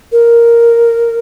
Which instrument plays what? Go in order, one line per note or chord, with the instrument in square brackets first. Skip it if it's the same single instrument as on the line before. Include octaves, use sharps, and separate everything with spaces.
[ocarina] A#4